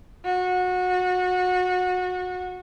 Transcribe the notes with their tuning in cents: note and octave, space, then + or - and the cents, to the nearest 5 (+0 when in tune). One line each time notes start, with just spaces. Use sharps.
F#4 -25